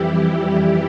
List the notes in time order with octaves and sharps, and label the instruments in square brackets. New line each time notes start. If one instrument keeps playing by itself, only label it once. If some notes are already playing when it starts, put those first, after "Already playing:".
Already playing: [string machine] F2 E3 G3 E4 G4